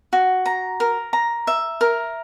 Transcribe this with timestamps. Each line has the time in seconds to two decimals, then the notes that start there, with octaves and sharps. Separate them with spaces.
0.13 F#4
0.46 A#5
0.80 A#4
1.13 A#5
1.47 E5
1.81 A#4